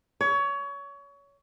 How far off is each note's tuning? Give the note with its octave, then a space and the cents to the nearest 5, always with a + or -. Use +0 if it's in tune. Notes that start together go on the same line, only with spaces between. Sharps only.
C#5 +25